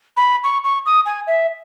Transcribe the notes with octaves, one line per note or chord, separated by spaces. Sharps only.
B5
C#6
C#6
D#6
G#5
E5